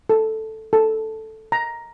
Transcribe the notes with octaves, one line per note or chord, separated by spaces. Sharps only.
A4
A4
A#5